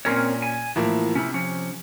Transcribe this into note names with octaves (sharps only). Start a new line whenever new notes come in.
A#2 C4 C#4 A#4 C#5
G#5
A2 E3 F3 A#3 E4
C3 C#4 E4
F3 C#4